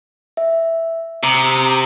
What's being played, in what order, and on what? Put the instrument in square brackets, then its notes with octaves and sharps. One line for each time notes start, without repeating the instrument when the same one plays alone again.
[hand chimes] E5
[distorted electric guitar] C3 [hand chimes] A#5 D#6